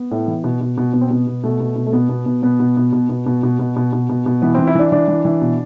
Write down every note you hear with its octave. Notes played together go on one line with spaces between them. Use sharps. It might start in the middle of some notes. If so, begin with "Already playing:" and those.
Already playing: B3
A2
E3
B2
B2
B2
B2 B3
C4
B2 B3
B2
B2 A3
B2
B2
A3
B2 B3
B2
B2
B2 B3
B2
B2
B2
B2
B2
B2
B2
B2
B2
B2
B2
E3 B3
E3 C4
E4
E3 D4
E3 D4
E3
E3
B2